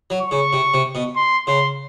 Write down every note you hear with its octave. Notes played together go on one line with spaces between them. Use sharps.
F#3
C#6
C#3
C3
C3
B2
C6
C#3 C6